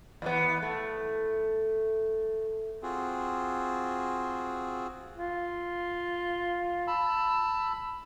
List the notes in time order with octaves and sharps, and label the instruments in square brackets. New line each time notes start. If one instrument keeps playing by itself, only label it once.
[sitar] D#2 E3 B3
A3
[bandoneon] C4 F4 F#4 G#4
[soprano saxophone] F4
[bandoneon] A5 B5 E6